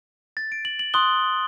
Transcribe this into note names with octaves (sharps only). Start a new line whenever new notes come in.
A6
D7
F#7
F#7
C6 D#6 F#6 G7